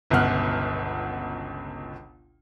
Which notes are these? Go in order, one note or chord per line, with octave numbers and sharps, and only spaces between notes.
G1 C#2 B2 F#5 F6 F#6